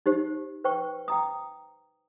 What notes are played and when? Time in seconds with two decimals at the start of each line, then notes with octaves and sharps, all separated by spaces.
0.06 D#4 G4 C5
0.64 B4 C5 G5 C#6
1.08 G5 A#5 D#6